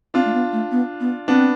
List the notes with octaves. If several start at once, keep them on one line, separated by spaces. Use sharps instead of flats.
C4 D4 F4
A3
B3
A3
B3
B3
B3 C4 D4